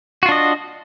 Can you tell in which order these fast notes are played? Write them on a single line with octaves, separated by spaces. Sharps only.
F#4 F4 D4 D#5